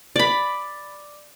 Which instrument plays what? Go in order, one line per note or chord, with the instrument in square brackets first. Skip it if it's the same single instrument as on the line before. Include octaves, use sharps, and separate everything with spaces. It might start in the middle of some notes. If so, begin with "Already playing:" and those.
[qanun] D5 B5